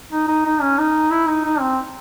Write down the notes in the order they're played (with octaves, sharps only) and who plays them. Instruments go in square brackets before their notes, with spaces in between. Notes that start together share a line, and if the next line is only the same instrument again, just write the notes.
[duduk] D#4
D#4
D#4
C#4
D#4
E4
D#4
D#4
C4